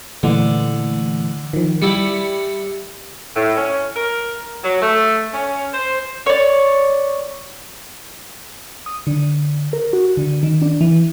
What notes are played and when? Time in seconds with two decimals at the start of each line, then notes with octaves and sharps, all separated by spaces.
0.23 A#2 D3 E3 A3
1.53 D#3 F3
1.82 G3 E4 C#7
3.35 A2
3.57 C#4
3.96 A#4
4.64 F#3
4.81 A3
5.33 C#4
5.73 C5
6.26 C#5 D5
8.86 D#6
9.07 D3
9.73 A#4
9.93 F#4
10.17 D3
10.43 D#3
10.62 D4
10.81 E3